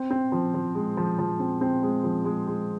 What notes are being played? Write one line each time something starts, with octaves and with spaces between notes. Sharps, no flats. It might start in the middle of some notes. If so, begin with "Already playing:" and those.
Already playing: C4
C4
F3
F3
G#3
F3
F3
C4
C4
G#3
F3
G#3
G#3